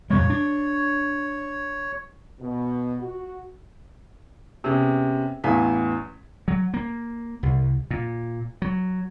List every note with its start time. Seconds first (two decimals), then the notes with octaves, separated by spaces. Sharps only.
0.10 F2 A#2 G3 C#5
0.30 D4
2.40 B2
3.02 F#4
4.64 C3 B3 C#4 G#4
5.44 A1 E2 E3 F5 G#5 B6
6.48 F#3
6.74 A#3
7.43 C2
7.91 A#2
8.62 F#3